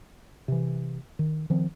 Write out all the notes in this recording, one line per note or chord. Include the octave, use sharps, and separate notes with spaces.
C3 E3
D#3
D#3 F3 C4